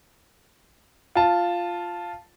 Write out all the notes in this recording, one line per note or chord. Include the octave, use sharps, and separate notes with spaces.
F4 A5